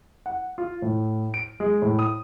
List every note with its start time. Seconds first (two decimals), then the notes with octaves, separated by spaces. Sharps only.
0.26 F#5
0.58 F4
0.82 A2
1.34 D7
1.60 G#3
1.82 A2
1.99 D#6